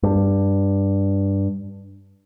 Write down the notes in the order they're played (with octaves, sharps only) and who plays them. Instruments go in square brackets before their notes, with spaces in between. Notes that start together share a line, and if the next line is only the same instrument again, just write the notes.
[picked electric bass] G2